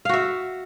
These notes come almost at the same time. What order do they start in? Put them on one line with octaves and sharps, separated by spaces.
F5 F#4 E5